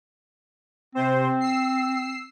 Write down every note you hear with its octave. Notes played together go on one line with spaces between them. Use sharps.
C3 C4 C5
E6 C7